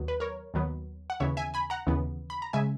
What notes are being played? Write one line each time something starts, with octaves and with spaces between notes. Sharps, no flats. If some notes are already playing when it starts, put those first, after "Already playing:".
Already playing: D#2 D#3 F#3 B3
B4
A#4 C#5
D#2 D#3 F#3 B3
F#5
D#2 C#3 E3 B3 C#5 E5
E5 G#5
G#5 B5
F#5 A#5
D#2 C#3 E3 B3
B5
A#5
C#3 G#3 E5 G#5